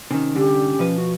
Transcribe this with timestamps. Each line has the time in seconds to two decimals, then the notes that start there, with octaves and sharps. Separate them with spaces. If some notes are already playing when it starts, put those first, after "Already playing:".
0.11 C3 D#3 C#4
0.35 C2 D3 G4
0.79 B2 F3 B4
0.98 F#4